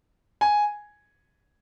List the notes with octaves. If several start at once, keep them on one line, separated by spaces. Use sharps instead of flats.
G#5